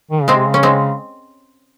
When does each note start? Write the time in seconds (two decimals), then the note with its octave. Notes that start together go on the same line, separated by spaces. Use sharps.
0.11 D#3
0.23 C#3
0.28 G#3 C4
0.36 C3
0.48 C#3
0.54 C#4
0.63 G#3 C4